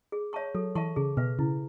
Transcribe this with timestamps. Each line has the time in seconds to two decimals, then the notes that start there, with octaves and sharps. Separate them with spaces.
0.12 G#4
0.33 C#5 E5 A5 C#6
0.55 F#3 A4
0.75 E3 E5 A5 C#6
0.96 C#3 G#4
1.17 B2 B4 E5
1.39 C#3 E4